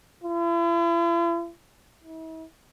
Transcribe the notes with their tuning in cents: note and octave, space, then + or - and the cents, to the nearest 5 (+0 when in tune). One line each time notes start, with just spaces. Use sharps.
E4 +45
E4 -40